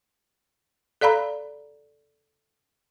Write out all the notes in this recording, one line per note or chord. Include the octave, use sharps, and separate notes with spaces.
A4 D5 F5 A#5 B5